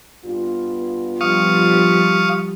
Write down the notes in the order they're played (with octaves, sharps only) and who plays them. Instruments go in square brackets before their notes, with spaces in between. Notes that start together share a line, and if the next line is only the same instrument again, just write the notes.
[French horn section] G2 B3 F4
[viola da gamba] F3 G3 [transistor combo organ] F5 C#6 D#6